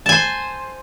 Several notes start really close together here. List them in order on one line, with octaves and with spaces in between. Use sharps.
A5 G#5 C5